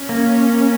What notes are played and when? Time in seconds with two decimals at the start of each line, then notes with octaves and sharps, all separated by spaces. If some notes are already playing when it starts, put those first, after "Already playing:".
Already playing: C#4
0.09 A#3